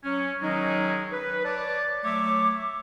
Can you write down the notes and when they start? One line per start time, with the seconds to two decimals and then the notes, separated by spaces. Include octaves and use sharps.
0.04 F#3 C#4
0.42 D#3 F#3 G#3 C#4 D#4
1.12 B4
1.45 C#5 D5 A5 D6
2.04 F#3 A3 C#5 E5 D6